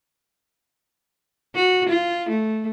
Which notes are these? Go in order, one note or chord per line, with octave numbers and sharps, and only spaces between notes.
F#4
F4
A3